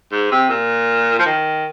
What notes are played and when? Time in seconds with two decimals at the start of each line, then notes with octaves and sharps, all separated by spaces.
0.12 G#2
0.31 C3
0.49 A#2
1.19 F3
1.25 D#3